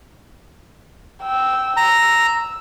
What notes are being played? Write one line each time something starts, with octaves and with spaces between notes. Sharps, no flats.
G5 E6
A#5 E6